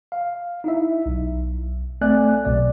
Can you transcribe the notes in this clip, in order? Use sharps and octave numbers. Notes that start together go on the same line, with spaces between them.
F5
D#4 E4 E5
B1
A3 C4 D5 G#5 F#6
B1 B2 D5